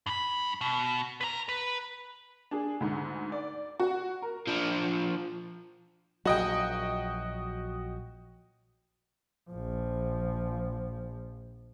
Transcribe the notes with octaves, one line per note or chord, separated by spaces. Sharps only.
G2 B5
B2
B4 A#5
B4
D4 G#4
D2 G#2
D5
F#4
A#4
F3 D4
A#1 F#3 F#4 D#5 G5
A#1 F3